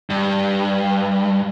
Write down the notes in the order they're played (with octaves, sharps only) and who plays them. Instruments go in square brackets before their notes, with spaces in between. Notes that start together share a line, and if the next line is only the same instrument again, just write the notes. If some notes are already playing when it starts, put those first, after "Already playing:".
[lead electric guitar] G2